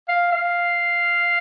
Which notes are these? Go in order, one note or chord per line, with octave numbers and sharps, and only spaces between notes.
F5
F5